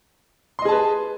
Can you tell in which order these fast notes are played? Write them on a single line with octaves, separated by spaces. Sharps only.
C6 D#5 G#4 A5 B4